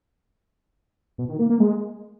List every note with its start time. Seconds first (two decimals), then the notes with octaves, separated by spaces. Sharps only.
1.18 B2
1.29 D#3
1.39 A#3
1.50 A#3
1.60 G#3